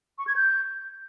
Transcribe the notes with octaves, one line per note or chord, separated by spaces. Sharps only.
C#6
G#6
G6